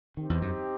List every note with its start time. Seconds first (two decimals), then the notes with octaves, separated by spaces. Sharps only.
0.17 D#3 C4 D#4 G4
0.30 E2
0.41 F#2